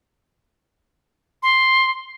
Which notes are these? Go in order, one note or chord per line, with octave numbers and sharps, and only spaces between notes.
C6